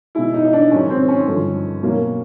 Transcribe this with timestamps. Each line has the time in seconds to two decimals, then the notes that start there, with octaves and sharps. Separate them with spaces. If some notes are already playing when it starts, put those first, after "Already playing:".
0.15 B2 G#3 E4
0.34 D#4
0.45 D#4
0.53 D4
0.71 G#2 D#3 F#3 C#4
0.90 C4
1.08 C#4
1.28 G2 D3 F3
1.83 B2 F#3 A#3